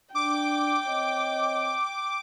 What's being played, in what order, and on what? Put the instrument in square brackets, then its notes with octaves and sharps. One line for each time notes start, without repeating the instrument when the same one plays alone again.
[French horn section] D4 [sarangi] G5 [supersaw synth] D6
[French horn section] C4 C#5 D#5